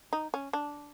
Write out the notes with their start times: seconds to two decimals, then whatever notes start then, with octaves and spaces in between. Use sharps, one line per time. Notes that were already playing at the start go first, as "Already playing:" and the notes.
0.13 D#4
0.34 C#4
0.53 D4